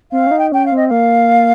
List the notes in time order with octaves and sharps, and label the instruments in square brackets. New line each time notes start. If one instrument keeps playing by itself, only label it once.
[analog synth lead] C4 [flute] F5
[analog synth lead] C#4
D#4
[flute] G5
[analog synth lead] C#4 [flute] G5
[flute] F5
[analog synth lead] C4 [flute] D#5
[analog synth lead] A#3 [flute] F5